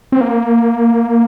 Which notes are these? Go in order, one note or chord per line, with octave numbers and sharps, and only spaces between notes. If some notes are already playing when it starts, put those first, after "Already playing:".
C4
A#3